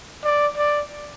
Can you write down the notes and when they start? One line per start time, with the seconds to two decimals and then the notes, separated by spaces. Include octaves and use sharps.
0.24 D5
0.57 D5